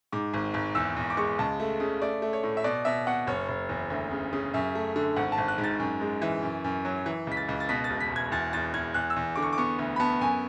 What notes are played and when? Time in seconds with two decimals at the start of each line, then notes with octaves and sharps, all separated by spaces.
0.12 G#2 D6
0.34 G#1
0.54 G#1
0.75 E2 E6
0.96 E2
1.10 D6
1.17 G#3 C#6
1.39 C#2 A5
1.60 A3
1.80 C#3
2.02 A3 D5
2.22 A3
2.33 C#5
2.43 A2
2.57 E5
2.64 B2 D5
2.85 B2 E5
3.07 B2 F#5
3.27 F#1 C#5
3.48 F#1
3.69 E2
3.90 D2
4.11 C#3
4.33 C#3
4.54 F#2 E5
4.75 A3
4.96 D3
5.16 G#1 F#5
5.32 A5
5.38 G#1
5.48 F#6
5.58 G#2
5.64 A6
5.80 F#2
6.01 G#3
6.22 E3
6.43 F#2
6.64 F#2
6.85 F#3
7.06 E3
7.27 C#2 B6
7.37 A6
7.48 C#2
7.60 A6
7.69 B2 B6
7.84 A6
7.90 E1
8.00 B6
8.10 E1
8.16 G#6
8.32 E2 A6
8.53 E2 A6
8.74 E2 G#6
8.94 E2 F#6
9.10 E6
9.16 E2
9.36 D3 D6
9.43 C#6
9.53 D6
9.58 B3 C#6
9.79 D2
9.96 B5
10.00 B3 A5
10.21 F#2 G#5